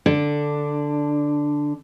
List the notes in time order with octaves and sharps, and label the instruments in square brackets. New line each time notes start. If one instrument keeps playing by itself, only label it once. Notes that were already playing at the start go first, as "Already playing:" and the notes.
[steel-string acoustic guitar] D3 D4